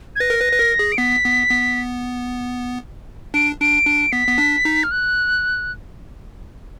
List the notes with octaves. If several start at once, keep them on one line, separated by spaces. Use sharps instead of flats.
G#6
B4 A#6
A#4
B4
B4
A#4
G#4
D7
B3 B6
B3
B3
D4 D7
D4 D7
D4
B3 B6
B3
D4
D#4
F6
F#6